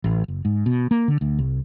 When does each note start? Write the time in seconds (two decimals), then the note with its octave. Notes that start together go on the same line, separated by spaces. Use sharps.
0.04 A1
0.28 F#1
0.45 G#2
0.66 B2
0.91 A#3
1.08 D3
1.21 D2
1.39 C2